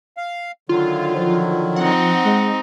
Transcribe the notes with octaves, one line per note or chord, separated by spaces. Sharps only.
F5
D3 D#3 F#3 F4
F3
C4 D#4 F#5
G#3